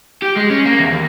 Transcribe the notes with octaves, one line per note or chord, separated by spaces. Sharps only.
G4
G#3
C#4
A#3
E2
D#2